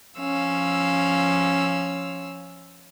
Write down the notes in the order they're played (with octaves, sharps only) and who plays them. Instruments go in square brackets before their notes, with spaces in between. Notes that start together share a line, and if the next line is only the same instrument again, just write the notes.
[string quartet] F3 C#4 F5 E6